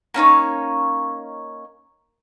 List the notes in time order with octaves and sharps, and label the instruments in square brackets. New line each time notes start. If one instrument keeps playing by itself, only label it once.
[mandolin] A#3 C#4 D#4 C#5